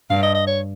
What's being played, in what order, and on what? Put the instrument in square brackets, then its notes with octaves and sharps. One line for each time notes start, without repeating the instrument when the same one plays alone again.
[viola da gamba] G2 [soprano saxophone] F5
[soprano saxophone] D#5
D#5
C#5